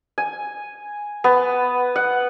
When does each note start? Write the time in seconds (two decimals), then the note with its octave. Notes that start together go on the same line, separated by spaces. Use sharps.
0.18 G#5
1.24 B3
1.96 F#5